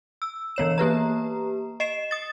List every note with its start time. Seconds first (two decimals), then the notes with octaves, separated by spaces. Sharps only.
0.22 E6
0.56 E3 B3 C#5 E7
0.78 A#3 G4 B4 A#5
1.80 D#5 C7 E7
2.11 D#6 A6